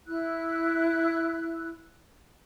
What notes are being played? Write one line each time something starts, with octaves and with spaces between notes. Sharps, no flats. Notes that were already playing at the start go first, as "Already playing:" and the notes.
E4 E6 F#6